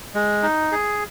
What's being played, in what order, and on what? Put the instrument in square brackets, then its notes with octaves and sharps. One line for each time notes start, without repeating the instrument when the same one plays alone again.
[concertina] G#3
D#4
G#4